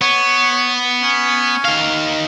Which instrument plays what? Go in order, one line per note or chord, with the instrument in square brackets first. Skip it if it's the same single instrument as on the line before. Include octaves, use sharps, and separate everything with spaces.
[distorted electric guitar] B3 [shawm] C#5
[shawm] C#4
[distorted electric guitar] D#3 F5